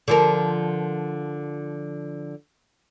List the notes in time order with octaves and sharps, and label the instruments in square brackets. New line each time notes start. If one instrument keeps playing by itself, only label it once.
[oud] D3 F3 A#4